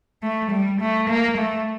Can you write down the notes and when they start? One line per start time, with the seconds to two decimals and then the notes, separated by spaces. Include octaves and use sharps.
0.23 A3
0.51 G3
0.80 A3
1.09 A#3
1.37 A3